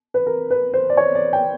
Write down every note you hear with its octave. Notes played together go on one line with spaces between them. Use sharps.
B4
A#4
B4
C5
D5
C#5
D5
G5